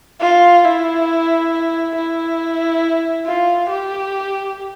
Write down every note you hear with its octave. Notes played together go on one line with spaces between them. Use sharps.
F4
E4
E4
F4
G4